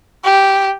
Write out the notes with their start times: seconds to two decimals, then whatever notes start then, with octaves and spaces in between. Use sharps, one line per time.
0.25 G4